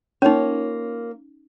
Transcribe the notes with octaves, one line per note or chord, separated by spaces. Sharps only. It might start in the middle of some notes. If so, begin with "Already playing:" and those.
A#3 C#4 D#4 F4 C#5